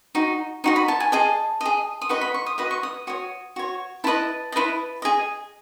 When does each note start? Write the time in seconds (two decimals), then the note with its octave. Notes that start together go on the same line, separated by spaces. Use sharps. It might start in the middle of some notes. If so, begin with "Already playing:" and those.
0.15 D#4 F#4
0.64 D#4 F#4 D#5
0.76 B5
0.88 A5
1.00 G#5
1.12 G#4 D#5 A5
1.61 G#4 D#5
2.02 D#6
2.09 F#4 B4 D#5 C#6
2.21 B5
2.34 C#6
2.46 D#6
2.58 F#4 B4 D#5 D#6
2.71 C#6
2.83 D#6
3.07 F#4 C#5 D#6
3.56 F#4 C#5
4.04 E4 B4 D#5 A5
4.52 E4 B4 D#5
5.02 G#4 D#5